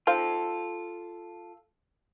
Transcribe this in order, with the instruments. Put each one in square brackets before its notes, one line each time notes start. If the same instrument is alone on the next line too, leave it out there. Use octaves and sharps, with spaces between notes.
[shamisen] D#4 C5 F5 [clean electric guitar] F4 A4